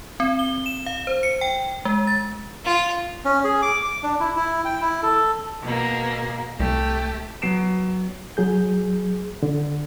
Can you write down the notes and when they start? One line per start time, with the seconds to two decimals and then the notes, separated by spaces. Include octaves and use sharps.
0.20 C4
0.39 G7
0.66 E7
0.86 F5
1.07 C5
1.23 C#7
1.41 G5
1.85 G#3
2.07 A6
2.65 F4
3.25 C#4
3.44 G#4
3.62 D6
3.82 D6
4.03 D4
4.20 E4
4.36 E4
4.65 G5
4.81 E4
5.03 A4
5.63 B2 A#3 G#4
6.60 C2 A3 G4
7.42 F#3 B3 C7 D7 E7
8.37 F#3 G#4 G6
9.43 D3